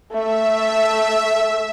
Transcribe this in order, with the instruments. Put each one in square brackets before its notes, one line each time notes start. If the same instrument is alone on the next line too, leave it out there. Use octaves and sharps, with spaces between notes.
[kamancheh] A3 [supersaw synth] E5